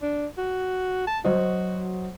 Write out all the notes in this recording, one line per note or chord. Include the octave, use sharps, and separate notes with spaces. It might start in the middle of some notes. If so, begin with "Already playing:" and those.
D4
F#4
A5
F#3 F#4 C5 D#5